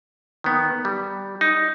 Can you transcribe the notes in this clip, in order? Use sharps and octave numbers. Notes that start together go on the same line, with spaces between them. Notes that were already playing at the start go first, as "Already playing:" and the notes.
D#3 B3
G3
D#4